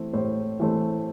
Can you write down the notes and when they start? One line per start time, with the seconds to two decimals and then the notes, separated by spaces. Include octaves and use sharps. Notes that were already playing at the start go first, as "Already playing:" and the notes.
Already playing: E3 A3 C4
0.13 A2 C5
0.60 E3 A3 C4